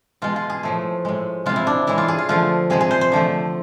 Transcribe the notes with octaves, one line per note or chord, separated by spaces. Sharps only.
B2 G#3 F4
F4
G#4
A2 F3 A3
A2 G#3
C3 G#3 F4
E4
D4
A2 E3 G#3 E4
F4
G#4
F4
D3 F3 A3 F4
C3 F3 G#3 G#4
G#4
C5
C5
D3 F3 A3